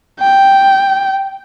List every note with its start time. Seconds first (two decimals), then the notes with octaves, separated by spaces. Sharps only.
0.20 G5